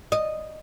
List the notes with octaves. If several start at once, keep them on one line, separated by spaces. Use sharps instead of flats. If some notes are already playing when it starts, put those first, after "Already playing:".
D#5